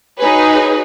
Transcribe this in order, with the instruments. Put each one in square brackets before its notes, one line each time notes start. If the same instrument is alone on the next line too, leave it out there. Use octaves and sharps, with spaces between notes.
[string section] D#4 F#4 G#4 B4 C#5